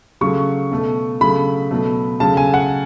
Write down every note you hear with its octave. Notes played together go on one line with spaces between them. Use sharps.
C#3 F#3 A3 C#6
B2 A3
C#3 F#3 A3 B5
B2 F#3 A3
C#3 F#3 A3 A5
G#5
F#5